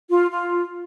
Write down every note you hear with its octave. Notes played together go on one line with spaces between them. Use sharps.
F4
F4